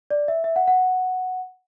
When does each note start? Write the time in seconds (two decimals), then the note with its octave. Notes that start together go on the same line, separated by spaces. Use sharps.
0.11 D5
0.28 E5
0.44 E5
0.56 F#5
0.68 F#5